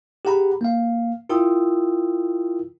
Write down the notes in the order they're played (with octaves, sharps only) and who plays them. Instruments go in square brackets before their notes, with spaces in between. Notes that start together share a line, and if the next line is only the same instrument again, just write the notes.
[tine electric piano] G4 G#4 F#5 A#5 B5
A#3 F5
E4 F4 A#4 G5 D#6 E6